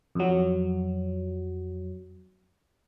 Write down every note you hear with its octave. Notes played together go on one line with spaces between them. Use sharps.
F2 F#3